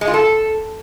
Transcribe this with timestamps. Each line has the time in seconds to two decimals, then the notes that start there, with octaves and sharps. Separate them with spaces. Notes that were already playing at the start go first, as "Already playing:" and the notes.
0.01 G#3
0.07 F4
0.14 A4